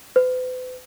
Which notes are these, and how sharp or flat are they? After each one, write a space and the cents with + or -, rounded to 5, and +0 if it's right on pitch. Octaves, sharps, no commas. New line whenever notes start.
B4 +45